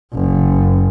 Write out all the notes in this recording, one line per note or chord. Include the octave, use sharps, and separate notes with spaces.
F#1